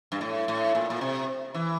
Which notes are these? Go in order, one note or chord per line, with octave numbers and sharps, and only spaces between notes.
G2
A2
A2
A#2
A#2
C3
E3